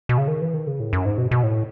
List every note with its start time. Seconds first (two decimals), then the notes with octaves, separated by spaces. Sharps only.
0.09 B2
0.18 C#3
0.28 D#3
0.41 E3
0.54 D#3
0.67 C#3
0.80 A2
0.93 F#2
1.06 G#2
1.18 B2
1.31 B2
1.43 A2